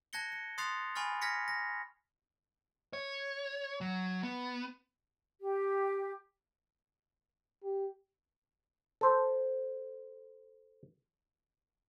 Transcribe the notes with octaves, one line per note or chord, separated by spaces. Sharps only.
A5 F#6 G#6 A#6 C#7 G7
C#7
C6 D#6 F#6 A6 C7 F7
G#5 B5 C#6 F6 A6
F6 G#6 A#6 B6 C#7
A#6
C#5
F#3
B3
G4
G4
A4 C5